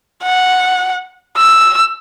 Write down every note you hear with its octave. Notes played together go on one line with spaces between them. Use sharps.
F#5
E6